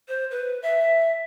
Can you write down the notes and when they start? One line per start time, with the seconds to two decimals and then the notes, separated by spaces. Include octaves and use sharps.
0.08 C5
0.31 B4
0.62 E5